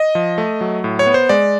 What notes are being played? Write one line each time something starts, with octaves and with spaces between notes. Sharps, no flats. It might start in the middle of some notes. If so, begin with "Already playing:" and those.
Already playing: D#5
F3
A3
F#3
A2
C#5
B3
C5
G#3 D5